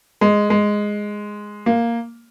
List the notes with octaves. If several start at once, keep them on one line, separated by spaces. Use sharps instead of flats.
G#3
G#3
A#3